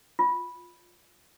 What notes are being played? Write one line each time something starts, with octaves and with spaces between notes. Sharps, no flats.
F4